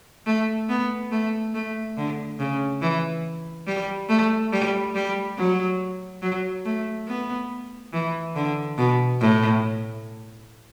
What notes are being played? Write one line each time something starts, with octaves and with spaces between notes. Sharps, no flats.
A3
B3
A3
A3
D3
C#3
E3
G3
A3
G3
G3
F#3
F#3
A3
B3
E3
D3
B2
A2